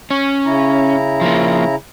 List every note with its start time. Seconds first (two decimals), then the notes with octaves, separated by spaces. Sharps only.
0.11 C#4
0.46 C#3 E4 A#5
1.21 F3 A#3